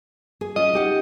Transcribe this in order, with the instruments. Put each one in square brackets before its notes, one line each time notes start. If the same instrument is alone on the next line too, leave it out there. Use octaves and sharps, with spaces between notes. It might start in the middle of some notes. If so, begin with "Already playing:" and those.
[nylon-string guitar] G#4
[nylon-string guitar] C#4 F4 [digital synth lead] D#5
[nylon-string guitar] D#4 G4 F#5